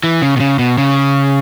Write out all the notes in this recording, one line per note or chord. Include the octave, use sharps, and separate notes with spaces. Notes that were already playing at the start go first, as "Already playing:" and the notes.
E3
C#3
B2
C#3
B2
C#3